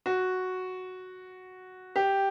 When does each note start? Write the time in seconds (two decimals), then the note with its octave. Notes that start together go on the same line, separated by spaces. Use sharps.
0.06 F#4
1.96 G4